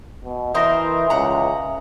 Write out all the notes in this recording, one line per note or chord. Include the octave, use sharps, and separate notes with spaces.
B2
E3 D#4 A#4 C5 E5 D#6 A#6
C#2 F#5 A#5